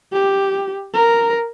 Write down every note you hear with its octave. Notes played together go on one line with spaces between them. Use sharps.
G4
A#4